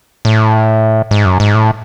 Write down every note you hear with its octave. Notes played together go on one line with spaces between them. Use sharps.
A2
G#2
F#2
G#2
A2